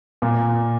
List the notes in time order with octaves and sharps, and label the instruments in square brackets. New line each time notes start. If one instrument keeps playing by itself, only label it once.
[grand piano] A#2